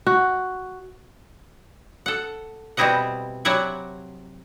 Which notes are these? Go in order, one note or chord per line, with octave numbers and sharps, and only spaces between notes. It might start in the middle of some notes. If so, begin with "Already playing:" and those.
F#4
A4 F#5
B2 G3 C4 E4 D#5 F#5
C3 F#3 E4 D5 F#5 G#5